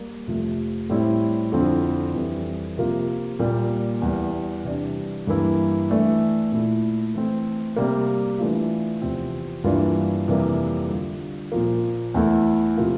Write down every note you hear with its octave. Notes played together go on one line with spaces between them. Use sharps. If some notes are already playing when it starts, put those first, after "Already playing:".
Already playing: G3 A#3
F2 C3 F3 A3
A2 G3 C4 E4
F2 D3 F3 C4 E4
F2 E3 G3
C3 F3 A#3 F4
A#2 G3 A#3
E2 E3 G3
C3 E3 G3 D4
G2 E3 A#3 E4
E3 A3 D4
A#2 A3 E4
E3 A3 C4
C3 G3 A#3
E3 A3 D4 F4
E2 C3 F3 C4
G2 E3 A#3 D4 F4
F2 C3 E3 G3 A#3
D3 G3 D4 F4
A#2 F3 A#3
E2 E3 A3 E4
C3 F3 A#3 F4